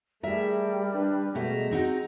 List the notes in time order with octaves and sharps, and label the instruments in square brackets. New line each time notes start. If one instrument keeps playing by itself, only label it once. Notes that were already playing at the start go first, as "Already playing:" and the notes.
[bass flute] G3 [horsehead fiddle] A3 G#4 [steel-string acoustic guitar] A#4 E5
[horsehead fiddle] D4 B4
[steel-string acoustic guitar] B2 A3 E5 [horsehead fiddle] G#3 A#5
[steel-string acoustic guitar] C4 D#4 F#4